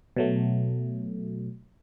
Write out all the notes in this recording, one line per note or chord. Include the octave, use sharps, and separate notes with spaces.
B2 F#3 A3